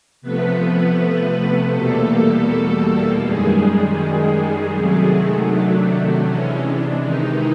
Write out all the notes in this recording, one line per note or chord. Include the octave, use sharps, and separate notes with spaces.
C3 F3 A3 B3 B4
E2 B2 G3 A3 A#3 A4
F#2 D#3 G3 G#3 G#4
C3 D#3 F#3 A3
D4
C3 E3 G#3 C#4
D4
D#3 D#4